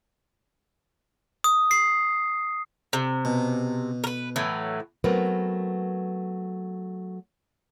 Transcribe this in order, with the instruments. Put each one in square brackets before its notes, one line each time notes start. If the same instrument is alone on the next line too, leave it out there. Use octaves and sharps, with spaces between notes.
[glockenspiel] D#6
C7
[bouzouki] C3
[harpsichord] B2
[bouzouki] A#4 B4
A2 E3 F#3
[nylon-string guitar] F#3 A3 B3 C4 A#4 B4